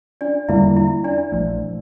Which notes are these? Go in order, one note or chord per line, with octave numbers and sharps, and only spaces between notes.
D4 D5
E2 D3 G3 A#3 E4 E5
E4 E5
D4 D5
A#1 A#2 F3 A3